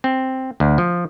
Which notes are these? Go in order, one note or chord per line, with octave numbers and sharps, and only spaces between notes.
C4
D2
F3